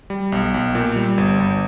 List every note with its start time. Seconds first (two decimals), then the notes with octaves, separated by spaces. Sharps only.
0.10 G3
0.32 B1
0.54 B1
0.75 A#2
0.96 G3
1.18 G1
1.40 G1